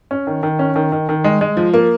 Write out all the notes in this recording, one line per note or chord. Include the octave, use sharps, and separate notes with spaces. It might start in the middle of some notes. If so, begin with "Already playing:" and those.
C#4
D#3
D#3
C#4
D#3
D#3
D#3
G#3
G#3
F3
A#3